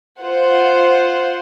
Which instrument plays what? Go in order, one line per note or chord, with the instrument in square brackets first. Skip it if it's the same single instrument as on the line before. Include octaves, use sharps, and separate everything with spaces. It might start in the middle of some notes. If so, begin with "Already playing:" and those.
[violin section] F4 C5 F#5